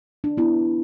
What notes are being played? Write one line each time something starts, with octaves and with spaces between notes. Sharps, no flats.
D4
B3 E4